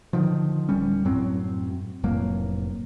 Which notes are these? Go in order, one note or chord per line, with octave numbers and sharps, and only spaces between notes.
D3 D#3 F3
D1 G3 C#4
F#2 A2 F#3 C4
F1 A2 F#3 A#3